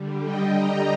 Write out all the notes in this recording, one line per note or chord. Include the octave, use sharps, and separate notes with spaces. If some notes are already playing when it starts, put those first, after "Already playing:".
Already playing: D3 G3
D#5 G5
G5 A#5